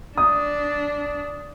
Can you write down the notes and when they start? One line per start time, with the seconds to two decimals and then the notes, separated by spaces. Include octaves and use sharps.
0.18 D4 D#6